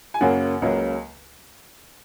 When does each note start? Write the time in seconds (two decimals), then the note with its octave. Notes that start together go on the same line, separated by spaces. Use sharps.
0.14 G#5
0.21 F#2 C#3 F#3 A#3 F#5
0.62 C#2 C#3 F#3 A#3